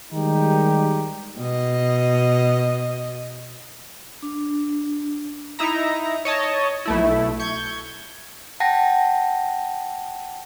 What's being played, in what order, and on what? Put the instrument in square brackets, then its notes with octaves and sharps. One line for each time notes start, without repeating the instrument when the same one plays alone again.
[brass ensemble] D#3 G3 G#3 D#4 G4
[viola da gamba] B2 D#5
[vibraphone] D4
[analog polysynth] D#4 E4 E5 A#5
C#5 D#5 A5
B1 A3 E4
C#6 G6 G#6
[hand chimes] F#5 G5 A5 A#6